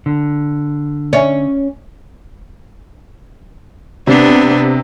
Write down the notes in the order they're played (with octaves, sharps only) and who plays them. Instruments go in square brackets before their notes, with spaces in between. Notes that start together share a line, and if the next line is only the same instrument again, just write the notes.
[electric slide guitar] D3
[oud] C#4 [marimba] D5 E5 G#5
[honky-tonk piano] C3 [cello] B3 D4